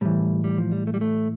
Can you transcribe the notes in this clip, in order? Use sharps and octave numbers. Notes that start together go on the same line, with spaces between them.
A2 E3 G3
G3
F3
G3
A3
G3
A3